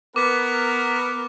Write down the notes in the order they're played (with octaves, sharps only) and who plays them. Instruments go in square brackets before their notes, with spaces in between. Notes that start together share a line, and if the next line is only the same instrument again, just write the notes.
[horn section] B3 A#4 [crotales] D6